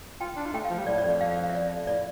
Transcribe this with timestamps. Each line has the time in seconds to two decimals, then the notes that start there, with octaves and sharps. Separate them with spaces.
0.21 F4 G5
0.36 D4
0.46 F4
0.53 A3 G5
0.65 F5
0.70 F3
0.78 G3
0.87 A2 D5
0.98 D5
1.04 F2
1.10 D5
1.21 F5
1.31 F5
1.43 F5
1.50 E5
1.55 D5
1.87 A2 D5